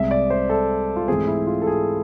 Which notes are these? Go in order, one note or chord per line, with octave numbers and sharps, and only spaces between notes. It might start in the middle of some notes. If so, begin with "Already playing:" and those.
Already playing: C2 C3 G#3 E5
D5
C5
A4
F4
G#2 E3 A3 C4 G#4
E4
F4
A4
G#4